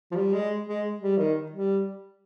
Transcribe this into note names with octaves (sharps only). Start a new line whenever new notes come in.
F3
G3
G#3
G#3
G3
D#3
G3